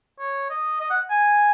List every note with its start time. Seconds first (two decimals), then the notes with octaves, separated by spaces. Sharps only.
0.20 C#5
0.50 D#5
0.80 D#5
0.90 F#5
1.10 G#5